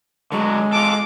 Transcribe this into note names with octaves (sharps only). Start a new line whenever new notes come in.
D3 F#3 G#3
F4 A4 D6